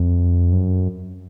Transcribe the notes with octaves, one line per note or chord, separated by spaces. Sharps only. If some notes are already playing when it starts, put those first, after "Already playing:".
Already playing: F2
F#2